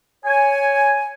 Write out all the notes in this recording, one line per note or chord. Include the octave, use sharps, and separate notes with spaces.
C#5 G#5